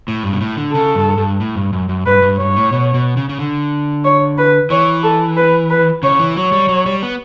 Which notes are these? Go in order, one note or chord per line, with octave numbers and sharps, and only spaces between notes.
A2
G2
B2
A2
D3
C#3 A4
G2
G2
A2
G2
F#2
F#2
G2 B4
G2
G2 C#5
A2
B2
B2
C#3
C#3
D3
C#5
B4
E3 C#5
A4
B4
B4
C#3 C#5
E3
F#3 C#5
G3
F#3
G3
B3